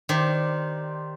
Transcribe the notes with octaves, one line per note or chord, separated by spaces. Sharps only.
D#3 G4 C5 D5